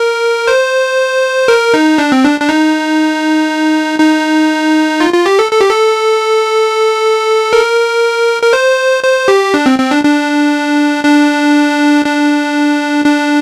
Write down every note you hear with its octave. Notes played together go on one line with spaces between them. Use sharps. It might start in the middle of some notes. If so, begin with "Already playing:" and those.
Already playing: A#4
C5
A#4
D#4
D4
C4
D4
D4
D#4
D#4
F4
F4
G4
A4
A4
G4
A4
A#4
A#4
C5
C5
G4
D4
C4
C4
D4
D4
D4
D4
D4